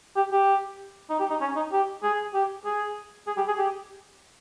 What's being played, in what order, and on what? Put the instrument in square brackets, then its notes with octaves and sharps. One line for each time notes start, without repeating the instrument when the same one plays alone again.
[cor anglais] G4
G4
D#4
G4
D#4
C#4
D#4
G4
G#4
G4
G#4
G#4
G4
G#4
G4